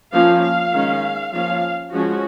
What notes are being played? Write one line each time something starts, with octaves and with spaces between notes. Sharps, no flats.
F3 A#3 C#4 F5
F5
D#3 G#3 C#4
F3 A#3 C#4 F5
F3 G#3 C#4 F#4